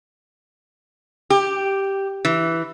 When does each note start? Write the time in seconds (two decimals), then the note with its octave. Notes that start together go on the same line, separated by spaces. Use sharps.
1.30 G4
2.25 E3